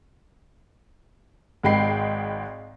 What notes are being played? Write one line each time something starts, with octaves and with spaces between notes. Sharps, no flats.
G#1 G#2 G#3 G5 B5 C7